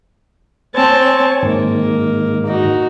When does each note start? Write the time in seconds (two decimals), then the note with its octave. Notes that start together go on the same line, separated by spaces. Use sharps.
0.75 C4 C#5 G#5 A5
1.42 G#2 D#3 A#3
2.46 D#4 F#4